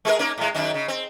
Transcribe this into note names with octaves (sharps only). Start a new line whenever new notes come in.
G#3 G#4 A#4
A#3 C#4 D#4
A2 G#3
F#2 D#3 D#4
C#3
C4